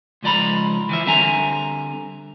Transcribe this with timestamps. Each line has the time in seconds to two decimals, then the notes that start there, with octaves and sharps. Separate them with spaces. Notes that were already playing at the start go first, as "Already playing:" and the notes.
0.23 C#2 G#2 F3 D5 A#5 B5
0.89 E3 F3 E5
1.06 D3 G3 C4 E5 G#5 A#5